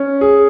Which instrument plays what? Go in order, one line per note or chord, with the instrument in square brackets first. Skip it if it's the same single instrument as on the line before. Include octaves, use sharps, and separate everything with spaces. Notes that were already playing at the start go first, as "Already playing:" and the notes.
Already playing: [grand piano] C#4
G#4